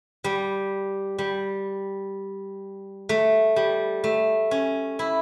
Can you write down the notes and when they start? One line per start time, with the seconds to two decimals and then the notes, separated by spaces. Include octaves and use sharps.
0.24 G3
1.19 G3
3.09 A3
3.56 G3
4.04 A3
4.51 C#4
4.99 E4